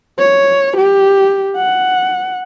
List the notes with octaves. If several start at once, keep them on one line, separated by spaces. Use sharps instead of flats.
C#5
G4
F#5